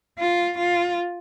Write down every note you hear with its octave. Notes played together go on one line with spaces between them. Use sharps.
F4
F4